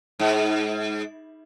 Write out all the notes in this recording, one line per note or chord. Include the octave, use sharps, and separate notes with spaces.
G#2